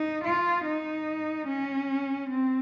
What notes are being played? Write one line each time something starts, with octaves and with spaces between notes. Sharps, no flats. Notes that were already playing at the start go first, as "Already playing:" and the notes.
Already playing: D#4
F4
D#4
C#4
C4